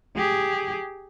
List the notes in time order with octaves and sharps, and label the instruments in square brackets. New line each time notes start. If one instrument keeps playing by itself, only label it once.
[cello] G4 G#4